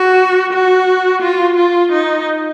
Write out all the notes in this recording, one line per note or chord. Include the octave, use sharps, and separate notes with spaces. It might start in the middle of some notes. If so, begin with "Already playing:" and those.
Already playing: F#4
F#4
F4
F4
D#4